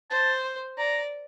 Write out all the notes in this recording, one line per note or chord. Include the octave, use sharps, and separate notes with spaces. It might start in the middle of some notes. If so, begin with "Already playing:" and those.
C5 A5
D5 A#5